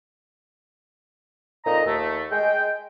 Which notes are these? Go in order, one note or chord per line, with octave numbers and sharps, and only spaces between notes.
F2 A#2 D#4 D#5 A#5
D#2 A3
G#3 G5